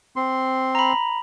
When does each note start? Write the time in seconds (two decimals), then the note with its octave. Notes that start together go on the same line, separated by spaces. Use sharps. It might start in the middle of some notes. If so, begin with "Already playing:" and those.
0.16 C4 C6
0.75 A#5 B5